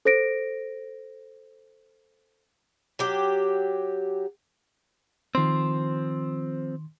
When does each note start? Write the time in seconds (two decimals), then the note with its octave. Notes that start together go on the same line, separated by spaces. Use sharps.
0.05 A4 C5 A#6 D7
2.99 F#3 G4
5.35 D#3 F3 C4 C6